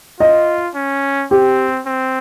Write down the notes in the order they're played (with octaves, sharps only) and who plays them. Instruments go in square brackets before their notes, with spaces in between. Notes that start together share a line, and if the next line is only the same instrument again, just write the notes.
[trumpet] F4 [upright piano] D#5
[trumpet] C#4
[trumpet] C4 [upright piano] G4
[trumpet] C4